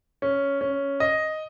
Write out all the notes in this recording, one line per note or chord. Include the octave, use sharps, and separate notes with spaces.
C#4
C#4
D#5